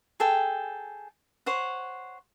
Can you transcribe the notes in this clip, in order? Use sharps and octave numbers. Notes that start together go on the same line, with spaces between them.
G#4 A4 G5
C5 C#5 F#5